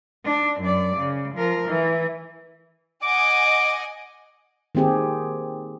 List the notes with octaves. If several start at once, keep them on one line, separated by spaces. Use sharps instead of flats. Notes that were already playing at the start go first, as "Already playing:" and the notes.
D4
F#2 D5
C#3
F3 A#4
E3
D#5 F#5 G#5 D6
D#3 A#3 C4 G4 G#4